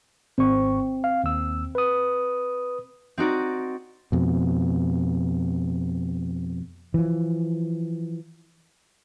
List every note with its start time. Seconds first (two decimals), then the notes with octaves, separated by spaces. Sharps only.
0.38 G#1 C4 C#6
1.04 F5
1.24 D#2 E6
1.75 B4 D#6
3.18 C4 D#4 F#4 D5
4.12 F2 B2
6.94 E3 F3